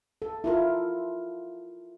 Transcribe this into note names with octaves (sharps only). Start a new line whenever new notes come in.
A4
E4 F4 A#4